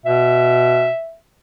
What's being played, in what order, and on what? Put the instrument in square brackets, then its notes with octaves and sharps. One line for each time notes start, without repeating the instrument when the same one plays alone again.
[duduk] B2 [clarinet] E5